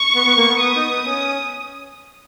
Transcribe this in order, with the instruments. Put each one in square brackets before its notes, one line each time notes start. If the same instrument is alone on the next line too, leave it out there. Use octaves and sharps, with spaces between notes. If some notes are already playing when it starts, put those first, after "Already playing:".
Already playing: [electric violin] C#6
[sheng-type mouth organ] B3
B3
A#3
B3
[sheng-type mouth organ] B3 [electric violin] D#6
[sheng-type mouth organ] D#4
B3
C#4